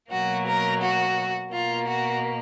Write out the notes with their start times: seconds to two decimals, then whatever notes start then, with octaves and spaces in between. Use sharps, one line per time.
0.12 B2 F#3 A#3 F#4
0.48 A#4
0.82 F#4
1.53 B2 A#3 F4
1.88 F#4